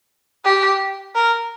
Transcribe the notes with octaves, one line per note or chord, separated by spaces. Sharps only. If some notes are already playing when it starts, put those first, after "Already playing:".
G4
A#4